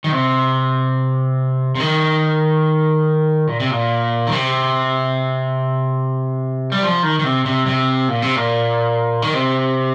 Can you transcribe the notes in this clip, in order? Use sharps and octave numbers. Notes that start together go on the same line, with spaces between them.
D#3
C3
C3
D#3
A#2
C3
A#2
D#3
C3
G3
F3
D#3
D#3
C3
C3
C3
A#2
C3
A#2
D#3
C3